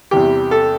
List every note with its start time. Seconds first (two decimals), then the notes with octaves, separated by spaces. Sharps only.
0.11 E2 C3 E3 G3 G4
0.51 A4